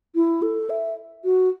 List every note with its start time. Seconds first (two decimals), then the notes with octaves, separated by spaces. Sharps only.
0.15 E4
0.42 A4
0.70 E5
1.24 F#4